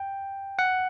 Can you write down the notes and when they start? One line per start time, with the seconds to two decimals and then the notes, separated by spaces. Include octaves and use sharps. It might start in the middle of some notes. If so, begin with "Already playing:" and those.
Already playing: G5
0.59 F#5